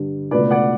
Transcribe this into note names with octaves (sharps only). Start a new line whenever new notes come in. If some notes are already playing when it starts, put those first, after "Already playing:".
Already playing: G2 D3 G3
C#2 B2 A3 B4 D5
D5 F#5